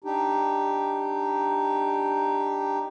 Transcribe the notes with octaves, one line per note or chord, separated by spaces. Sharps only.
D4 D#4 G4